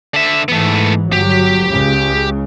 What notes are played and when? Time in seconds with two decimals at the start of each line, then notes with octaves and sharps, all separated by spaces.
0.14 D3 E5
0.48 G#2 E3 A3 B3
1.12 G1 F#3 G4
1.67 C#2 C#3